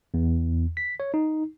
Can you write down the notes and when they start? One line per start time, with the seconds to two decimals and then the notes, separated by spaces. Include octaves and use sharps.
0.14 E2
0.77 B6
1.00 C#5
1.14 D#4